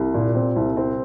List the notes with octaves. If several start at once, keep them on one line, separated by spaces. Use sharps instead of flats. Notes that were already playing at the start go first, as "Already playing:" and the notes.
Already playing: C2
A#2
C4
C2
C4